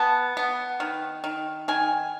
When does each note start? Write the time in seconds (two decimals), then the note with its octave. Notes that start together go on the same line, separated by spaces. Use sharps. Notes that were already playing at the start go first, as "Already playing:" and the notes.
Already playing: B3 A5
0.37 B3
0.80 D#3
1.24 D#3
1.68 D#3 G#5